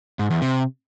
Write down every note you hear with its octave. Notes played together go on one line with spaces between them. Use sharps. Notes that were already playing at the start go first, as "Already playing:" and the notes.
G#2
E2
C3